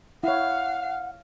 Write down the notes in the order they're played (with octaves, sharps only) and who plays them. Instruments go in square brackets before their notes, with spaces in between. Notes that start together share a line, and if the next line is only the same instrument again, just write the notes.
[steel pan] E4 C#5 [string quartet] F5 [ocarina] F#5